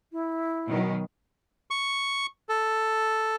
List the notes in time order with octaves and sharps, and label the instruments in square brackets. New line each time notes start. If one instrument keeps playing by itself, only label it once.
[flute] E4
[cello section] B2 D#3 F#3
[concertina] C#6
A4